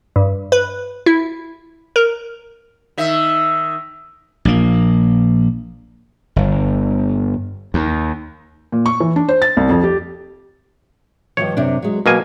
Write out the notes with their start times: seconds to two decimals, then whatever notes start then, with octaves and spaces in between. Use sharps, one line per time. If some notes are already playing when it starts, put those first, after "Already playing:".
0.16 G2
0.52 B4
1.06 E4
1.96 A#4
2.98 D#3 E5
4.45 A#1 A#3
6.36 G1
7.74 D#2
8.72 A#2
8.86 C#6
9.00 E3
9.16 D4
9.29 C5
9.42 A6
9.57 C2
9.69 F2
9.84 G4
11.37 G2 D#3 F3 C#5
11.57 F#2 C3 D4
11.82 F#3 G#3
12.06 B2 F#3 A#3 G#5